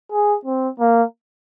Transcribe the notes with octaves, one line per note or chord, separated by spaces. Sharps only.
G#4
C4
A#3